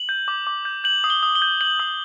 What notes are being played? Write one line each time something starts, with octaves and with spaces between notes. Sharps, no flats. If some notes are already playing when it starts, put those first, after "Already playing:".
Already playing: F#7
G6
D6
D6
G6
G6 F#7
D#6
G7
D#6
G7
G6
G6 F#7
D#6